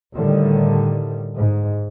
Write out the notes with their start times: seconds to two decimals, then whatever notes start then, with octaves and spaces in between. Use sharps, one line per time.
0.13 A2 D3 D#3 G3
1.35 G#2